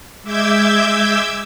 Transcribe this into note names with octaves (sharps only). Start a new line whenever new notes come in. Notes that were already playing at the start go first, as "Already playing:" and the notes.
G#3 E5 D6 E6 G6 G#6